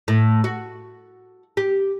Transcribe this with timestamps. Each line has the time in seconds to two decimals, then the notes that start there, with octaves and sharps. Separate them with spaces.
0.08 A2
0.44 F#4
1.57 G4